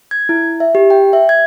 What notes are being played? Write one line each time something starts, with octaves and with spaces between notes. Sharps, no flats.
G#6
E4
E5
G4
G5
E5
G#6